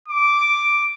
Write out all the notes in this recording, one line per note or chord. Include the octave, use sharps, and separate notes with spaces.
D6